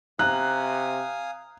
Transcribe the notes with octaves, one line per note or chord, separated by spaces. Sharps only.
C3 F5 G#5 A#5 D#6 F#6